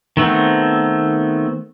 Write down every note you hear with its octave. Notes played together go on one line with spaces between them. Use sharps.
D#3 A3 B3 C4